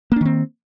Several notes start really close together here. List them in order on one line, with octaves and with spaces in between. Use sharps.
A#3 D4 D#3 C4